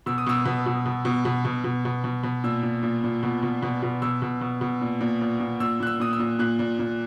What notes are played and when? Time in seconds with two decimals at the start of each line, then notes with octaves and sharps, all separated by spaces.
0.06 B2 E6
0.18 D#6
0.27 B2 E6
0.45 B2
0.66 B2
0.86 B2
1.05 B2
1.25 B2
1.45 B2
1.64 B2
1.85 B2
2.04 B2
2.23 B2
2.44 A#2 E6
2.63 A#2
2.83 A#2
3.04 A#2
3.23 B2
3.43 B2
3.62 B2
3.83 B2
4.02 B2 E6
4.22 B2
4.41 B2
4.61 B2
4.81 A#2
5.01 A#2
5.21 A#2
5.40 A#2
5.60 A#2 E6
5.80 A#2 F#6
5.87 E6
6.00 A#2 D#6
6.13 E6
6.19 A#2
6.39 A#2 F#6
6.59 A#2
6.79 A#2